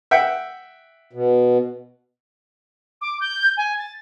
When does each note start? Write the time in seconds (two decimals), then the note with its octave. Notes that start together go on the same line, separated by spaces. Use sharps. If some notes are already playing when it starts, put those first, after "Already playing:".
0.11 E5 F#5 G5
1.13 B2
3.01 D6
3.20 G6
3.57 G#5
3.78 A6